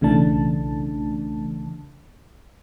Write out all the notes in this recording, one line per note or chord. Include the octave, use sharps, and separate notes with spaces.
B1 C#3 E3 A3 D4 A5